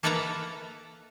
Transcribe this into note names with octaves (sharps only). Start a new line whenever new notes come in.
A#3 A4 B4 E5 A5 A#5